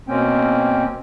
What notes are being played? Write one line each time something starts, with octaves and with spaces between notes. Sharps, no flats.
B2 A#3 C4 C#4 G5